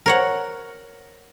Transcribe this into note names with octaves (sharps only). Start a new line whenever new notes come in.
A#4 C#5 F#5